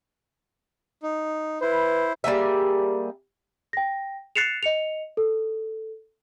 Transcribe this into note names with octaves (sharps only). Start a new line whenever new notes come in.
D#4
E4 B4 C5
G3 A#3 G#4 E5
G5 A#6
F#6 A6 C7 C#7 E7 F7
D#5 C#7 F7
A4